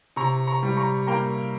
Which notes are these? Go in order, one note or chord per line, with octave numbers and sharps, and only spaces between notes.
C3 A#5 C#6
A#5 C#6
G3
A#5 C#6
A#3 G5 A#5